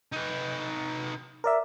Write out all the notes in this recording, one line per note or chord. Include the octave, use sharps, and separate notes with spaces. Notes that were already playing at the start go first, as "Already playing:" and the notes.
D#4 B4
A#4 D5 E5